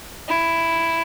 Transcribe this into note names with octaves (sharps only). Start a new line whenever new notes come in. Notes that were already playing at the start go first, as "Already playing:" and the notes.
E4